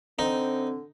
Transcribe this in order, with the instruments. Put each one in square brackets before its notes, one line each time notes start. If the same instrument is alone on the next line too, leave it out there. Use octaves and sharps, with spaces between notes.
[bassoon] D3 [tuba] C4 [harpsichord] D#4